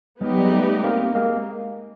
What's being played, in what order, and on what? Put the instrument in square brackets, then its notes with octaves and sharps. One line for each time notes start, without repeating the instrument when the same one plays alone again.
[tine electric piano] F#3 G#3 [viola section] B3 D#4 G4
[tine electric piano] G3
G#3
G3 A3
A#3 C4
G#3 A#3